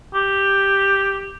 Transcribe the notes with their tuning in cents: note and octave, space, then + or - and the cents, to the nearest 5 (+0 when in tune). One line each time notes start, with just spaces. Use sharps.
G4 +5